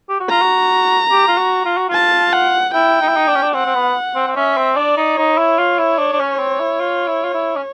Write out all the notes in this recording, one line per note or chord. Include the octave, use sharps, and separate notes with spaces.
G4
F#4
F4 A#5
F#4
G4
F4
F#4
F4
F#4
F4 A5
F#5
E4 G5
D#4
E4
D#4
D4
C#4
D4
C4 F#5
C4
B3
C4
C4
C#4 E5
C4
D4 D5
D#4
D#4 C#5
E4
F4
E4
D4
D4
C#4
C4
E4
F4
E4
F4
E4
C#4